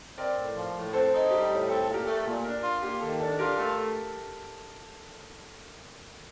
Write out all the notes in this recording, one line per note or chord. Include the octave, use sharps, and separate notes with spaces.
C4 A#4 D5
A2
F3
A2
C4 A4 C5
D#4
G3 G4
A2
C4 A4
A4
A#2
G4 A#4
A3
A#2
D4 A#4 D5
F4
A#3 G4
D#3 A4
D4 A4
F4 G4 A#4
A3 A4